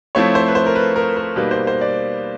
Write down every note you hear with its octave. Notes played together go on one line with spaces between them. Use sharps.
F3 A3 C4 E4 C#5
C5
B4
C5
A#4
B4
A#4
A#4
B2 G3 A#3 D#4 B4
C5
C5
D5